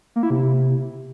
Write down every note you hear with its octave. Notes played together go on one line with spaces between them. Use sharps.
A#3
E4
C3